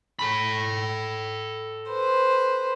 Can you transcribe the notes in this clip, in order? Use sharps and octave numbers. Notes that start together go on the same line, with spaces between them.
A4 B5
B4 C5